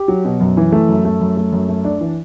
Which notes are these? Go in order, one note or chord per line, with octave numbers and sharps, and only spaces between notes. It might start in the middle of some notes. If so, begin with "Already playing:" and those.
Already playing: G4
F#3
B2
F#2
E3
A3
F#2
A3
F#2
A3
F#2
A3
D4
E3